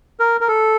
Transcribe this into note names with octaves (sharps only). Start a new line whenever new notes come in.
A#4
A#4
A4